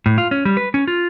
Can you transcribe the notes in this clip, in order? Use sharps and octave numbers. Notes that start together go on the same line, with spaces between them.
A2
F4
C#4
G3
B4
C#4
F4